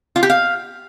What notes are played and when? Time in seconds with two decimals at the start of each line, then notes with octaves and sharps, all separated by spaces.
0.16 F4
0.23 G4
0.30 F5